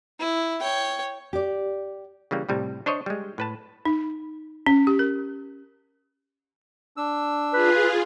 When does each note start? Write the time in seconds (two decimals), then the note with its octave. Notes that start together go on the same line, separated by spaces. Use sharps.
0.19 E4
0.60 C#5 G5
1.33 G4 D5
2.31 C#3 E3 G3 A#3
2.49 A2 C3 G3
2.86 D4 C5 C#5 D#5
3.06 G3 G#3
3.38 A2 B4 A5
3.86 D#4
4.66 C#4
4.87 G4
4.99 A#4
6.97 D4 E6
7.53 F4 G#4 B4